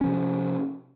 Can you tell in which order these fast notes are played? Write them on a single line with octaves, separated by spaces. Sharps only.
C#4 F3 C3